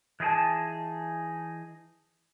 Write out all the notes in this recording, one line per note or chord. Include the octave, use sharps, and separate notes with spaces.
E3 D#4 G#4 G5 A5